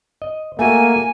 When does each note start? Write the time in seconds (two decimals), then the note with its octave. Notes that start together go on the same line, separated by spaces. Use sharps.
0.22 D#5
0.59 A3 A#3 F#4 G#5